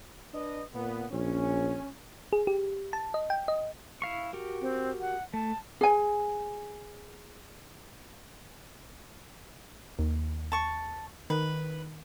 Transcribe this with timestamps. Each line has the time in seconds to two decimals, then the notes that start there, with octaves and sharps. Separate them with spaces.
0.34 D4 B4 D#5
0.74 A#2 B3
1.12 A#1 C#4
2.33 G#4
2.47 G4
2.93 A5
3.14 D#5
3.30 G5
3.48 D#5
4.02 E4 F5 C#6
4.33 F#4 G4 A#4
4.61 C4
5.01 F#5
5.34 A3 A5
5.81 G#4 G#5
9.99 D#2
10.52 A5 C#6
11.30 D#3 B4